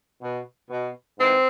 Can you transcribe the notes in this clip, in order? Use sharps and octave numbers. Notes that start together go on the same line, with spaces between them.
B2
B2
G#2 E3 C4